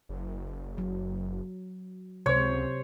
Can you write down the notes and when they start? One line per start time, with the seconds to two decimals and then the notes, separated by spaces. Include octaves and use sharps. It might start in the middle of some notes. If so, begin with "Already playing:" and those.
0.09 F#1
0.78 F#3
2.26 C#2 C3 C5 C#5